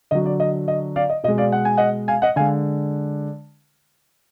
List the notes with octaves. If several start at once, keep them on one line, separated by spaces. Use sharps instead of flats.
D3 F#3 D#5
D5
D#5
D#5
D5 F5
D#5
B2 G#3 D#5
D5 F5
F#5
G#5
D#5 F#5
F5 G#5
D#5 F#5
D3 G#3 F5 G#5